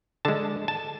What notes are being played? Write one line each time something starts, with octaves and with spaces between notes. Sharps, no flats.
D3 G#3 A5
A5